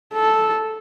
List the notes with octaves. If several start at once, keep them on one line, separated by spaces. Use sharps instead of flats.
A4